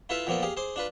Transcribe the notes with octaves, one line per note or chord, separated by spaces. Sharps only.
E4 F4 A4 B4 E5 F5
A#2 F3 A#3 B3 A4
G4 G#4 F5
G#4 C5 C6 D6
D4 F4 B4